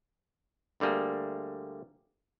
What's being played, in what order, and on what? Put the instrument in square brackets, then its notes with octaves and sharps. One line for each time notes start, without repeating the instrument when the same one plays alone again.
[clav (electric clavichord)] D2 D3 G3 A#3 G#4